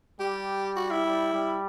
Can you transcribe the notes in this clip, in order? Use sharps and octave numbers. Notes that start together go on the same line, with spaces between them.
G3 G4
F#4
E4
G3
G3